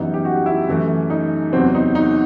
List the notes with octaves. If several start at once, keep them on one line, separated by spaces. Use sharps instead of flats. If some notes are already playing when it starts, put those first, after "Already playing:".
Already playing: F#2 E3 G3 B3 D#4
G4
F#4
E4
F#2 E3 A3
D#4
E2 C3 F#3 B3 C4
D#4
D#4